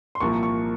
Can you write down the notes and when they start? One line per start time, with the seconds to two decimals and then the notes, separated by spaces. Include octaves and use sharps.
0.15 C6
0.20 C2 A#2 F3 A#3 C#6
0.43 C#6